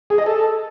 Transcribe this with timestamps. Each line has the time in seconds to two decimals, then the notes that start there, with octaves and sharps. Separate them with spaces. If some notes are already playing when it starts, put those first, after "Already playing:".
0.10 G#4
0.18 D#5
0.26 A4